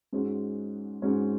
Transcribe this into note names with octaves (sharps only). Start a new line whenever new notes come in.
G#2 G#3 C#4 F#4
G#2 G#3 C#4 F#4